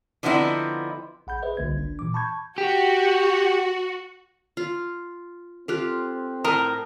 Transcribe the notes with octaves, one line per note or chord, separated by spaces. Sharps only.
D3 F3 B3 C4 D#4 E4
A#1 F#5 B5 G6
G#4 B4 C5 D#5 E5
G1 C2 D3 A#3 G#6
D4
A#2 E3 D6
A5 B5 C#6 G6 G#6
F#4 G4
F4
C4 F4 G4 A4 F#6
A2 A#4 D#5 A#5 D#6